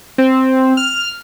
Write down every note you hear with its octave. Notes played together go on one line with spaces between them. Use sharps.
C4
F6